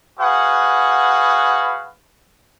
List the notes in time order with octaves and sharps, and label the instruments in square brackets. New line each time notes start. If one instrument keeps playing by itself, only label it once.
[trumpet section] F#4 G#4 B4 F5 F#5